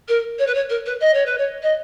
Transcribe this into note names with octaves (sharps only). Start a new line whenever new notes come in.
A#4
C#5
B4
C#5
A#4
B4
D#5
C#5
B4
C#5
D#5